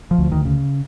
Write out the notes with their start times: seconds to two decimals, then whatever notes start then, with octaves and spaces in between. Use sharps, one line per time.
0.11 F3
0.18 D2
0.32 D#3
0.45 C#3